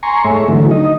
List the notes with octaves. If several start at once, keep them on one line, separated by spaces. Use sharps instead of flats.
G#5 A#5 C6 C#6
G#2 A3 C#5 E5
D3 E3 F#3 A3
D#4 D#5